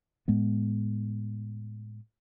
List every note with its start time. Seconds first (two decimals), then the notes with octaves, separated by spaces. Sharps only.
0.28 A2 G#3 B3